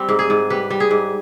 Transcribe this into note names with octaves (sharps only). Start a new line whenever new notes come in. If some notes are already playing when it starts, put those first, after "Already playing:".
Already playing: G3 C4
G#2
G#4
G#2
G3 B4
G3
G#4
G#2